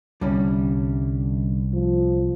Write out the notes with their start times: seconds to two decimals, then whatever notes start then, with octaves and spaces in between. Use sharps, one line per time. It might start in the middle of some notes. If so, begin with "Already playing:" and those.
0.21 C2 D3 G3 C#4
1.73 F3